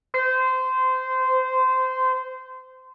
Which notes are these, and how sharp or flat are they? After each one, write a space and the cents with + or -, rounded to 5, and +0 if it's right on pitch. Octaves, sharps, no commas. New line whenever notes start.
C5 -20